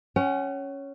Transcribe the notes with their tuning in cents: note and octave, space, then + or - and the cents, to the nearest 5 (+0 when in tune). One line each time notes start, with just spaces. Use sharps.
C#4 +0 F#5 +40